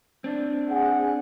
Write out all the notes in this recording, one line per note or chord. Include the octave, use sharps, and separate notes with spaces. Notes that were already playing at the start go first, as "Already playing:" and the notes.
C4 D4
G#4 F#5